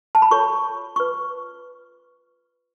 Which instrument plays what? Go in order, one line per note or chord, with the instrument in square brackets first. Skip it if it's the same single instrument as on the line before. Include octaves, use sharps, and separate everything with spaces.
[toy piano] A5
B5
F4 A4 C#5 C#6
F4 B4 C#6